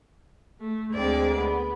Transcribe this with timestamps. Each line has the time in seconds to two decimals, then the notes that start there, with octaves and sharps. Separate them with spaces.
0.60 A3
0.91 D2 G#3 C4 D5
1.37 B3